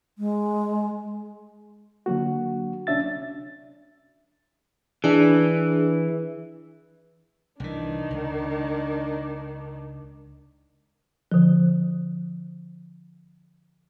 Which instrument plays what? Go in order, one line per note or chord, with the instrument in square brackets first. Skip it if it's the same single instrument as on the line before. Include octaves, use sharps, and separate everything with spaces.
[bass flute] G#3
[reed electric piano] D3 F#3 A#3 F#4
C2 C#4 D4 E5 A6
[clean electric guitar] E3 [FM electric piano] D4 G#4
[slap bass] C2 E3 [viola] D#3 D4
[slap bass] C#2
[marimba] D3 F3